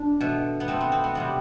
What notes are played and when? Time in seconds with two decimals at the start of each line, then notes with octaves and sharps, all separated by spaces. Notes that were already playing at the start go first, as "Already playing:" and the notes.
Already playing: D4
0.20 B2 A3
0.60 B3
0.68 B2 A3 C4
0.81 B3
0.92 C4
1.04 B3
1.15 C3 G3 B3